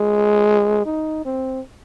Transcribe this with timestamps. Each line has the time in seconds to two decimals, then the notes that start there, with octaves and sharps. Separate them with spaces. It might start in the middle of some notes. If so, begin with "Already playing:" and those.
Already playing: G#3
0.86 D#4
1.25 C4